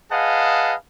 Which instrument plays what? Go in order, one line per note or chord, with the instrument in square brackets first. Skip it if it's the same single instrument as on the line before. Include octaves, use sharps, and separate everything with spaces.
[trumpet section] G#4 B4 D#5 F5 F#5 A5